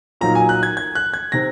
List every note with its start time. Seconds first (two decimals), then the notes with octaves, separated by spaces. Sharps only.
0.21 A#2 F#3 A#3 D#4 A#5
0.35 G#5
0.49 F#6
0.63 G#6
0.77 G#6
0.95 F#6
1.14 G#6
1.32 C3 D#3 A#6